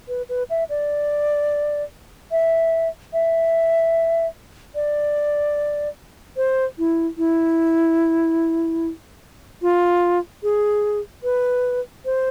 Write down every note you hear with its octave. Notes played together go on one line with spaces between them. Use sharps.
B4
B4
E5
D5
E5
E5
D5
C5
E4
E4
F4
G#4
B4
C5